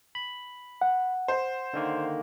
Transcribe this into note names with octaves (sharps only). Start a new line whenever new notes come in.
B5
F#5
C5
D3 D#3 A#3